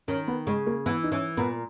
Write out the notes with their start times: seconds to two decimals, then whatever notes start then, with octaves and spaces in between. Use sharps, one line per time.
0.08 D#3 C#4
0.28 B3
0.47 C#3 G#3
0.67 A#3
0.86 E3 B3
1.03 D#4
1.11 E3 C#4
1.37 A#2 B3